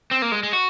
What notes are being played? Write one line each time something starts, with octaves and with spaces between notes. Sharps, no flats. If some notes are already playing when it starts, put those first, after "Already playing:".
C4
A#3
G#3
G#3
F#4